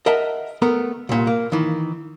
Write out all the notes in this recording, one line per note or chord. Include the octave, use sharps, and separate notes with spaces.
A#4 D#5 E5 F#5 A5 A#5
A3 B3 A#4
C2 A#2
A#3
D#3 E3